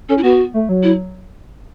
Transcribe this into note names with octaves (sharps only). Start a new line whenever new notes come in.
C#4 A4
E4
B3 F#4
A3
F#3
E4